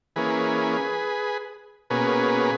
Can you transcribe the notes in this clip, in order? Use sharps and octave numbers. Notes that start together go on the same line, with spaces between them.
E3 A#3 C#4 G#4 B4
B2 A#3 C#4 G#4 B4